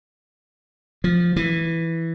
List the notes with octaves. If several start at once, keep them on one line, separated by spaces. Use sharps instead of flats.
F3
E3